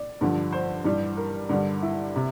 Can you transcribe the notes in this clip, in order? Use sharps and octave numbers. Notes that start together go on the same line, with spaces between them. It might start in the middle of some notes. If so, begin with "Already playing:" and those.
Already playing: D5
G2 D3 F3
C5
G2 E3 G3
A#4
G2 D3 G3
E4
C3